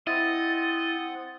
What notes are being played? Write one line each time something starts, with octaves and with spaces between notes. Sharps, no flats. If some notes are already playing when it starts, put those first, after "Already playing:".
C4 E4 D#5 F#5 D#6 A6